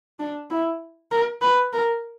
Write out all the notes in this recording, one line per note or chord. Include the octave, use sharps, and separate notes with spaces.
D4
E4
A#4
B4
A#4